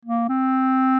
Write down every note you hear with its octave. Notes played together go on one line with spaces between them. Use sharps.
A#3
C4